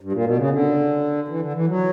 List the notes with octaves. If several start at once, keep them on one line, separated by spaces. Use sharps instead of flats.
G2
A#2
B2
C#3
D3
E3
D3
E3
F#3